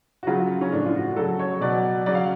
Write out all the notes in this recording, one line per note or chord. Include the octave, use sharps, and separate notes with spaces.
F#4
C#3 F#3 F4
C#4
A2 F3 D4
F4
F#4
C#3 F#3 A4
C#5
B2 F#3 D5
C#3 F#3 D5
F5